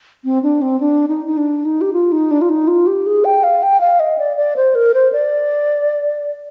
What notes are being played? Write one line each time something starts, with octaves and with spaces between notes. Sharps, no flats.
C4
D4
C4
D4
D#4
D#4
D4
D#4
G4
F4
D#4
D4
F4
D#4
F4
G4
G#4
G5
F5
G5
F5
D#5
D5
D5
C5
A#4
C5
D5